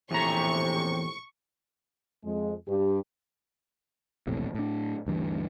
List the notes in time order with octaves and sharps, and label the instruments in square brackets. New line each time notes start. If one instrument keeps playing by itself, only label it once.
[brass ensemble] A#1 A2 C3 [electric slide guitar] E2 A#5 [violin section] C#6
[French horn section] F2 G#3
G2 G4
[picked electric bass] E1 A#1 A2 C3
A2 D4
D2 G2 E3